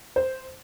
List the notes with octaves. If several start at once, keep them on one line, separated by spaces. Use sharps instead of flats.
C5